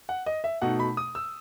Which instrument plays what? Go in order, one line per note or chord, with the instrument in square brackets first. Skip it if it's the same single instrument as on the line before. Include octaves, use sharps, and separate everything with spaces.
[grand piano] F#5
D#5
E5
B2 A3 D#4 F#5
B5
D#6
E6